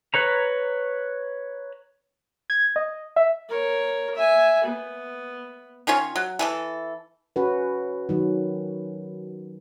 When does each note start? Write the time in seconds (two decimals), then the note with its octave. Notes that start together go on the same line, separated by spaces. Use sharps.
0.14 B4 C#5 A#5
2.50 G#6
2.76 D#5
3.16 E5
3.49 A#4 C#5
4.15 E5 G#5
4.64 B3
5.87 D#3 C#4 F4 C#5
6.16 F#3
6.39 E3 G#4 A4
7.36 C#4 F#4 B4
8.09 D#3 F#3